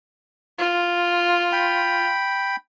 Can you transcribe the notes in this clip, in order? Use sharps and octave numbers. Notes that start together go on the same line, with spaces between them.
F4
G5 B5